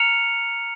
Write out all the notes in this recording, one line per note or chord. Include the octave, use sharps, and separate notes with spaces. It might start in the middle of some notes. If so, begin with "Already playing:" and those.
Already playing: A#5 F6 C#7 F7